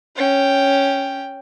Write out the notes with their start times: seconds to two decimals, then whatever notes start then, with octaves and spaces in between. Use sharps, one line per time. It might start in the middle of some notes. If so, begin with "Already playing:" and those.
0.16 C#4 G5